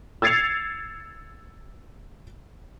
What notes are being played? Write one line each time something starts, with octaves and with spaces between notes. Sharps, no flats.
E6 G#6 A6 C7 C#7 F7